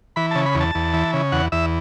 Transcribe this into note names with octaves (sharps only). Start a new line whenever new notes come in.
E3 B5
C#3 A5
B5
E2
A5
E2
E3
C#3
E2 F#5
E2 E5